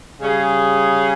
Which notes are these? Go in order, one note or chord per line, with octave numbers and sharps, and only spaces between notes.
C#3 G3 C#4 G#4